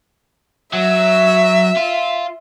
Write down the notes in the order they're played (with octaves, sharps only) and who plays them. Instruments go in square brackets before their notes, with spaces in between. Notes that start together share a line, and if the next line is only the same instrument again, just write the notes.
[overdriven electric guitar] F#3 [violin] E5
[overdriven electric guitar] F4